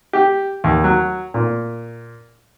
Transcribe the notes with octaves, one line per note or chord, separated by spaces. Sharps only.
G4
D#2
F#3
A#2